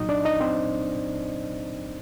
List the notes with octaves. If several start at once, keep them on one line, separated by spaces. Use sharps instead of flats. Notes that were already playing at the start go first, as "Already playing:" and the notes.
Already playing: C2 A#2 F#3 D#4 D#5
D4 D5
D#4 D#5
C4 C5